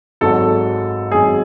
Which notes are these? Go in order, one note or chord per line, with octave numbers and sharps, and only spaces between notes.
G#1 G#2 F#3 A4
G#1 G#2 F#3 G#4